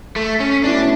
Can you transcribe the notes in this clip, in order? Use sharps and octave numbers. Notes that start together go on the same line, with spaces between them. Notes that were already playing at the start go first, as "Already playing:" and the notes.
A3
C#4
B2 A3 C#4 D4 E4